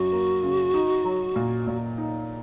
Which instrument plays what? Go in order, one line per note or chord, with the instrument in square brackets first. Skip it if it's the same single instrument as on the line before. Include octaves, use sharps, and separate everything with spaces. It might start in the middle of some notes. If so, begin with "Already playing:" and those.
Already playing: [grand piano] F#2 [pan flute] F#4
[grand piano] A#3
C#3
D#4
F#3
A#2
A#2
D#4